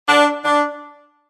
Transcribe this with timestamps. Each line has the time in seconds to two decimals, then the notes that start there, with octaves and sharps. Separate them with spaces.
0.08 D4
0.45 D4